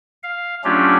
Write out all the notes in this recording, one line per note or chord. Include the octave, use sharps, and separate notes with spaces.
F5
F#3 A3 C#4 D4 F4 G4